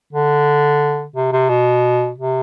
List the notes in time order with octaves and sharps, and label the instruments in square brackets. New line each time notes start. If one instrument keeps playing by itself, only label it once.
[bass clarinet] D3
C3
C3
B2
C3